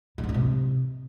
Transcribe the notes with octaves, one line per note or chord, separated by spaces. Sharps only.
D3
G#2
E3
C3